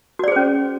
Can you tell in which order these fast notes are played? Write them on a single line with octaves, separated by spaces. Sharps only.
F#4 D5 G#4 C5 C#4